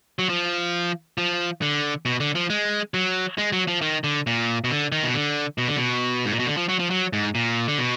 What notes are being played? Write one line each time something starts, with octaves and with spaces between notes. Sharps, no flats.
F#3
F3
F3
D3
B2
D3
F3
G#3
F#3
G#3
F#3
F3
D#3
D3
A#2
B2
D3
D#3
B2
D3
B2
D3
B2
G#2
A#2
B2
D3
F3
F#3
F3
F#3
G#2
A#2
D3
B2